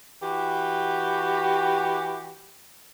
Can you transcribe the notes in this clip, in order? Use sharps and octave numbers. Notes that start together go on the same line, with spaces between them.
E3 F#4 G4